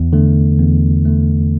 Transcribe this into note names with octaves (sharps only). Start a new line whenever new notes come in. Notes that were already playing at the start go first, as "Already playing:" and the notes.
Already playing: E2
D3 A3
E2
D3 A3